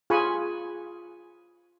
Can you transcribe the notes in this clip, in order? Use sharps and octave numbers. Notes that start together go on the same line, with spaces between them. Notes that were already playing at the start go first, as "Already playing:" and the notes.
F4 G#4 G#5 B5 C#6